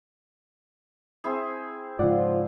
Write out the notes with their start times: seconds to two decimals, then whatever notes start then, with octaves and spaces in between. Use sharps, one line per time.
1.24 C4 E4 G#4
1.99 G#2 C#3 F3 F4 D5 F#5